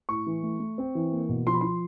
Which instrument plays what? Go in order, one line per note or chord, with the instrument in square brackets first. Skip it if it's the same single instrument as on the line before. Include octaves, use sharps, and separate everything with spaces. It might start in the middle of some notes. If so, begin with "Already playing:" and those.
[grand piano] A2 C#6
E3
A3
A3
C4
E3
A#3
B2
F3 C6
B5
F3 C6